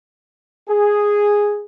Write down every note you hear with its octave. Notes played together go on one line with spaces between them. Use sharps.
G#4